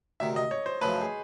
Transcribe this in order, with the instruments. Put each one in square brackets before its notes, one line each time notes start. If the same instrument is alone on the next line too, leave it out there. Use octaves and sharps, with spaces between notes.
[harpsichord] D2 C3 D#3 [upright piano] E5
[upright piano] D#5
C#5
C5
[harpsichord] F#2 C#3 F3 A3 [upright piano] B4
[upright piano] G#4